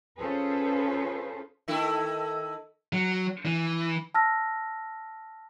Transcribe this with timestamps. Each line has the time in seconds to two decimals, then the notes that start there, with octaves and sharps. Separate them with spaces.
0.20 C#4 F4 G#4 A4 B4 C5
1.68 D#3 A3 E4
2.93 F#3
3.46 E3
4.14 A5 E6 F6 A#6